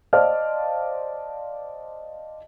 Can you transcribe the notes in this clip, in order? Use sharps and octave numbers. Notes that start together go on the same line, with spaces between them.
C5 D5 D#5 F5 A5 F6